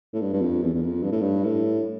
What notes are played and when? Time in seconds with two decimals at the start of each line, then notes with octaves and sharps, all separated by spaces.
0.14 A2
0.21 G2
0.33 G2
0.41 F2
0.62 E2
0.74 E2
0.84 F2
1.03 G2
1.12 A2
1.21 G2
1.44 A2